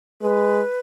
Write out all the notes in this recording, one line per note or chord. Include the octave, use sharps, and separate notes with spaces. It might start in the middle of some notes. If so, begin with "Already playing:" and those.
G#3 B4